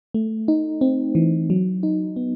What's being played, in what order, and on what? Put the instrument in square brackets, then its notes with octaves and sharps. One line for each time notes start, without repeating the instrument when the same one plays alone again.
[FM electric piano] A3
D#4
C4
E3
F#3
D#4
B3